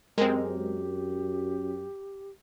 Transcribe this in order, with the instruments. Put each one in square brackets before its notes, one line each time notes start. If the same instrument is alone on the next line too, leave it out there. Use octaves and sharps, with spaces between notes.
[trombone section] F#2 [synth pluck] G#3 C4 [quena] G4 [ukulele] A#4